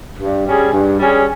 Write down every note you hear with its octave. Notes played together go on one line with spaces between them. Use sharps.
G2
G3 C#4 G#4
G2
G3 C#4 G#4